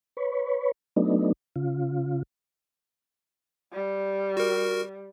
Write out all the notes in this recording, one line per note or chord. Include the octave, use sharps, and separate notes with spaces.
B4 C#5
F#3 A3 B3 D4 D#4
C#3 F4
G3
F#4 A#4